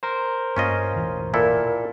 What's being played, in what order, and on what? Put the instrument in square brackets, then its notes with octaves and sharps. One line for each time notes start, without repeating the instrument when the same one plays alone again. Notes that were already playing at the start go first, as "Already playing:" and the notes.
[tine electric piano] A#4 C5
[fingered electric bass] G2 A#3 [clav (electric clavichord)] C#4 F4 D#5
[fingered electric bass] E1 A1 E3
[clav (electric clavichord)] A#2 E4 A4 [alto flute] A#4